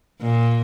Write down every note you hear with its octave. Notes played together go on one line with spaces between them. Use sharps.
A#2